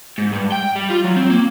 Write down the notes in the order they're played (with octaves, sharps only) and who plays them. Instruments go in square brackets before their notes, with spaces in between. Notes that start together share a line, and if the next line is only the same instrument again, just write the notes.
[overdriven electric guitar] G#2
G2
G5
G3
F4
F#3
C4
A#3